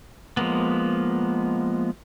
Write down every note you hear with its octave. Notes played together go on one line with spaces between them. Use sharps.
F3 G#3 A#3 B3